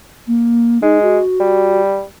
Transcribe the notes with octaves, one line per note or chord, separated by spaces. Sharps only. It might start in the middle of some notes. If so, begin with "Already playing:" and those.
A#3
G#3 D#4
F#4
G3